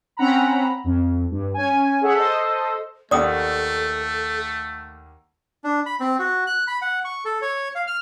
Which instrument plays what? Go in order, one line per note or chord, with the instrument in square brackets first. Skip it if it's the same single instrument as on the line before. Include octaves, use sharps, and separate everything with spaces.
[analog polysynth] C4 C#4 F#5 A#5 B5
F2
G2
C#4 G#5
G#4 A4 C#5 E5 F#5
A4 C5 D#5
[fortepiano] D#2 A#3 F#5 [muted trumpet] A3 [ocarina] A4 [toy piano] D5 D#6
[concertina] D4
B5
C4
F#4
F#6
B5
F#5
C#6
A4
C#5
F5
F6